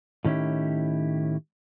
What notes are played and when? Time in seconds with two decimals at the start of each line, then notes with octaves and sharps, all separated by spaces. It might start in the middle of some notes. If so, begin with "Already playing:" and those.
0.25 A2 D#3 C#4 E4 G4